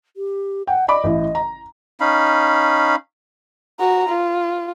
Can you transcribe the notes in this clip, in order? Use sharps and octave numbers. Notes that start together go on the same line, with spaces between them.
G4
F#5 G5
D5 D#5 B5 D6
A1 E4
A#5
C#4 D#4 F5 B5
F#4 A#5
F4